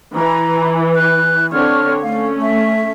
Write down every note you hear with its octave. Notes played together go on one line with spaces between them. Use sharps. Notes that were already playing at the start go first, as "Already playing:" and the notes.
E3 A#5
F#6
D3 C4 C#5 F6
A3 C#4 F5
E5